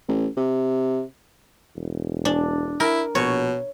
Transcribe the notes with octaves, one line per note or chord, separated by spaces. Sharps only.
A1
C3
E1
D4
E4 A#4
A#1 B2 C#5